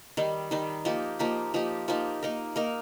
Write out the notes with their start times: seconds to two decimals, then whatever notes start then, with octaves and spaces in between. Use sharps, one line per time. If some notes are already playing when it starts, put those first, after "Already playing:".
0.17 D#3 G3 D#4
0.51 D#3 G3 D#4
0.85 F3 A#3 D#4 G4
1.19 F3 A#3 D#4 G4
1.54 F3 A#3 D#4 G4
1.88 F3 A#3 D#4 G4
2.22 A#3 D#4 A#4
2.56 A#3 D#4 A#4